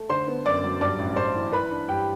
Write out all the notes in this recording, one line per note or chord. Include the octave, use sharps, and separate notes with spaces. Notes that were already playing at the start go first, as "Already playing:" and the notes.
Already playing: A3
D3 C5 C6
B3
F#2 D5 D6
F#3
G2 D5 D6
A1
A1 C5 C6
E3
E3 B4 B5
D4
G2 G4 G5